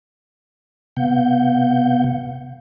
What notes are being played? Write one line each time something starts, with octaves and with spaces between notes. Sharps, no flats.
C3 B3 F5 F#5 G6